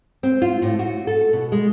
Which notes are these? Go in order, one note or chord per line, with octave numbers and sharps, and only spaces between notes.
C4
F4
A2
F#4
A4
B2
G#3